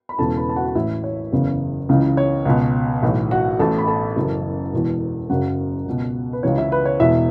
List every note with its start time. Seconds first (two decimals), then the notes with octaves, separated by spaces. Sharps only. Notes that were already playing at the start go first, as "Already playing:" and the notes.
0.09 B5
0.18 E1 E2 C#3 E3 A4 A5
0.37 B4 B5
0.49 A5
0.56 F#4 F#5
0.66 F#5
0.75 A1 A2 E3 E4 E5
1.04 C#5
1.32 F#1 E2 C#3
1.89 C#2 C#3 E3
2.17 C#5
2.45 C#2 B2
3.03 B1 A2 E3
3.31 F#4 F#5
3.59 A1 A2 E3 A4 A5
3.78 B5
3.87 A4 A5
4.16 F#1 F#2 E3
4.73 E1 E2 E3
5.30 F#1 F#2 C#3 F#4 F#5
5.86 C#2 B2
6.33 B4
6.43 C#2 C#3 E3 C#5
6.58 E4 E5
6.72 B4
6.85 C#5
7.00 E1 E2 B2 E4 E5